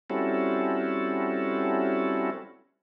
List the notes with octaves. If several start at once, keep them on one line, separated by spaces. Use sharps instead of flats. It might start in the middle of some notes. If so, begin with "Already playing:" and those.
G3 C4 C#4 E4 F#4 A4